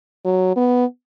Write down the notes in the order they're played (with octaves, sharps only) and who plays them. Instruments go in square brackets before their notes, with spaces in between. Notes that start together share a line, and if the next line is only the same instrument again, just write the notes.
[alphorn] F#3
B3